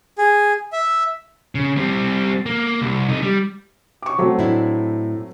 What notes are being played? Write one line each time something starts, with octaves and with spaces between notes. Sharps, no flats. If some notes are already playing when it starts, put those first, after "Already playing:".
G#4
E5
C#3
G3 C4
A#3
C2
C3 D#4
G3
C#6 D6
F#3 A3 C4
A2 D4 E4